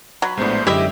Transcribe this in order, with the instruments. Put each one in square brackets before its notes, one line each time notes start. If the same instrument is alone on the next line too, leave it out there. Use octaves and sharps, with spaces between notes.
[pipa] F#3 [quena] B5
[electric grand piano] A#1 A2 [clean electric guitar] G#3 B3 D4 [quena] C5
[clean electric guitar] F#2 D3 G#3 [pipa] E4 E5 [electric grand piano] G4 D#5 [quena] G5